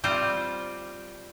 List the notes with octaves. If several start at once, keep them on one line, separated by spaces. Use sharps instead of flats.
G3 C4 F4 C5